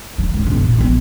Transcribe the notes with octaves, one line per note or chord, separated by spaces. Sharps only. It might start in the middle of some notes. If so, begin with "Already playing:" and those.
F#3
A1 D2
B1 F#2
A#2
A#1 B3